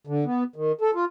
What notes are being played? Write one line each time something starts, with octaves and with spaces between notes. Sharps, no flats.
D3
B3
D#3
A4
F4